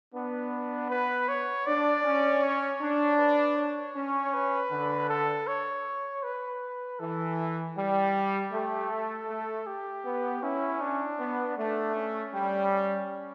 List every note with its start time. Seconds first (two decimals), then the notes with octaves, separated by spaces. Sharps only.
0.14 B3 D4
0.90 B4
1.28 C#5
1.67 D4 D5
2.04 C#4
2.43 C#5
2.81 D4
3.19 B4
3.57 C#5
3.96 C#4
4.34 B4
4.71 D3
5.09 A4
5.47 C#5
6.23 B4
6.99 E3 A4
7.76 G3 G4
8.53 A3
8.91 A4
9.28 A3
9.67 G4
10.05 B3
10.42 C#4 E4
10.81 D4
11.19 B3
11.57 A3 D4
11.95 C#4
12.33 G3
12.71 C#4